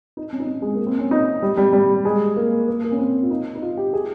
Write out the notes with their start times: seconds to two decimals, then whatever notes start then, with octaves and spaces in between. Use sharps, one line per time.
0.17 D#4
0.33 C#4
0.40 D#4
0.47 C#4
0.62 G#3
0.75 A#3
0.87 C4
0.99 C#4
1.11 D#4
1.42 G3
1.57 G3
1.73 G3
2.05 G#3
2.36 A#3
2.68 A#3
2.84 A#3
2.92 C#4
2.98 C4
3.23 F4
3.30 D#4
3.55 D#4
3.62 F4
3.77 G4
3.93 G#4